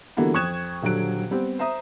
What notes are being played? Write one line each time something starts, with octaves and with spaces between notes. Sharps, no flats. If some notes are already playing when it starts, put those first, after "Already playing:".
D3 E3 G3 A#3 B3 F#4
F2 C#6 D#6 F#6 G#6 E7
D#1 D3 F#3 F#6 D7
G3 B3 C4 G4
C5 E5 A#5 D#6